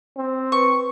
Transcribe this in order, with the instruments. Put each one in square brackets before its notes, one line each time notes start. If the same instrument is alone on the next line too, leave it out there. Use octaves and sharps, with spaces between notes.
[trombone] C4
[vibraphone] B4 [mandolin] C#6